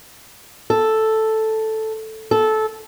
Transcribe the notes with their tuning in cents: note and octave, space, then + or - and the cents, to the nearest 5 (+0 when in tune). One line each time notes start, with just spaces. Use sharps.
A4 +0
A4 -15